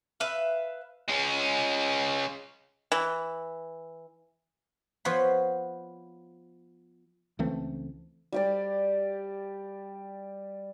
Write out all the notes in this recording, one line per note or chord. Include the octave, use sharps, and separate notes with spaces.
B4 E5 F5
G#3 C#4
E3
F3 B3 C5 C#5 F#5 B5
C#2 E3 A3 C4
G3 G4 D5